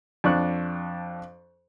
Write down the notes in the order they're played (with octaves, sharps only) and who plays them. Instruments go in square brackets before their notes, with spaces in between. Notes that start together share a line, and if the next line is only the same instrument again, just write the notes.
[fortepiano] F2 D4 C#6 F#6